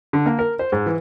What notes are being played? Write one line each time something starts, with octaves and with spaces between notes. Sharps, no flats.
D3
A#3
A#4
C5
G#2
E3